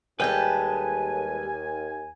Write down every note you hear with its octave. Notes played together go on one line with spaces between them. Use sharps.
D#2 G3 G#3 A4 B4 G5 G#5 G6